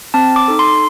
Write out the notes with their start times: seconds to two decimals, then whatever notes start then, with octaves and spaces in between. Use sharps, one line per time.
0.14 C4 A5
0.36 D6
0.48 D#4 A4
0.59 C6